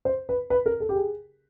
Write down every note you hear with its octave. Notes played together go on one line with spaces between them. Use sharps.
C5
B4
B4
A#4
A4
G4
G#4